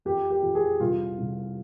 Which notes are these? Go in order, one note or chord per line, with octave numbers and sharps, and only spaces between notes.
F2 G4
G4
F2
G#4
C2 F4
C2